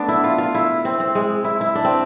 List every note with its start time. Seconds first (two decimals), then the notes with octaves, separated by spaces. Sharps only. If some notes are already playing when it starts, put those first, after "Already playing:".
Already playing: A3 B3 D4
0.08 E4
0.24 F4
0.38 F4
0.55 E4
0.85 C4
1.00 C4
1.15 G#3
1.44 E4
1.61 E4
1.75 D4
1.84 C4